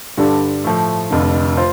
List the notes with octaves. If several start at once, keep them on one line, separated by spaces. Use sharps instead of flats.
G2 D3 G3 D4 A4
A2 F3 A3
F1 F2 D3
F4 C5